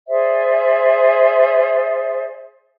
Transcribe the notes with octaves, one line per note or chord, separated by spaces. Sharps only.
G#4 C5 D5 E5